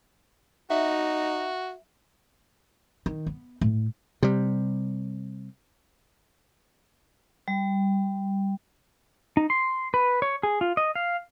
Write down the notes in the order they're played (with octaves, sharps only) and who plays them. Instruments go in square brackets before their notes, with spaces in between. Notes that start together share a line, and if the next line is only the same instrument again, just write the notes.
[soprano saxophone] D#4 [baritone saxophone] F#4 [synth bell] E5
[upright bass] D#3
B3
A2
[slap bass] C3 G3
[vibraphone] G3
[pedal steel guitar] D#4
C6
B4
C#5
G#4
F4
D#5
F5